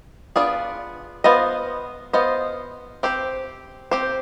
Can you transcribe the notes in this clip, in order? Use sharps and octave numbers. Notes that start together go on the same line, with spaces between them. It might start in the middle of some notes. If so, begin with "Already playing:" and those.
B3 D4 F4 G#4 D5
B3 F4 C5 D#5
B3 F4 C5 D#5
C4 G4 C5
C4 G4 C5